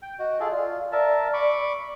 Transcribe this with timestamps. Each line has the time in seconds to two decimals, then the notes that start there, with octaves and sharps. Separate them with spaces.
0.02 G5
0.19 F#4 D#5
0.40 F4 G#4 A4
0.51 F4 D5
0.92 A#4 D5 E5 A5
1.33 B5 C#6 D6